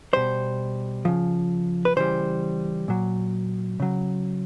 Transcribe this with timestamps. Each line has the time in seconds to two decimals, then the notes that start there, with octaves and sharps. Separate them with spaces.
0.13 B2 G3 C5
1.05 C#3 F3
1.85 B4
1.96 C#3 E3 G3 C5
2.88 A#2 F#3
3.80 C#3 F#3